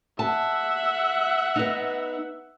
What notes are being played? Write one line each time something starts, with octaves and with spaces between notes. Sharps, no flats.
E5 F#5 A5
B3 D#4